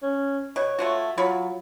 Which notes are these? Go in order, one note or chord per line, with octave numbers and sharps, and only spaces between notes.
C#4
B2 C#5
A3 F4 F#4
F#3 F4 C#5 B5